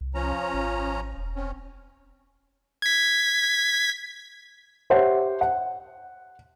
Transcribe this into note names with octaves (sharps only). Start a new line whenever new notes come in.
C2
F3 C#4 A#5
G#1
E1
C4 C#4
G#6 B6
G4 C5 C#5 E5 F#5
F#5